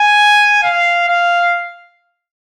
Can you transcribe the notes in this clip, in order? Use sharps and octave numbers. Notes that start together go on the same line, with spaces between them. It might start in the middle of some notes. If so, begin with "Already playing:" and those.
Already playing: G#5
F5
F5